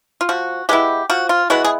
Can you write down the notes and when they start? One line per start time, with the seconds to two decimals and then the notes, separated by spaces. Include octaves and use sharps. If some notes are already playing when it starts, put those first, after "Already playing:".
0.21 F4
0.29 F3 F#4
0.69 G#3 B3 E4 G4
1.10 F3 F#4
1.29 F4
1.50 G#3 B3 E4 F#4
1.64 G#4